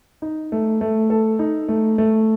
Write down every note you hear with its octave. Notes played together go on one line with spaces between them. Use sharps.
D#4
A3
A3
A4
D#4
A3
A3